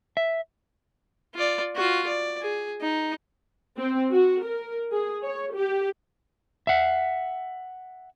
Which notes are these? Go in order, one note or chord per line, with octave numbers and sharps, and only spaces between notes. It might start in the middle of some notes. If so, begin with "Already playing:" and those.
E5
F4 D5
F4 F#4
D5
G#4
D#4
C4
F#4
A#4
G#4
C#5
G4
E5 F#5